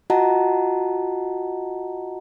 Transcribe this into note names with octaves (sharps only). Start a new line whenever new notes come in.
F4 F#4 D#5 F#5 A5 A#5